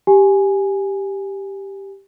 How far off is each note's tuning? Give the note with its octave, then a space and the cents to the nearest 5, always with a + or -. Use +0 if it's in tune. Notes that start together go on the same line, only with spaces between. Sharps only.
G4 +0 G#5 +0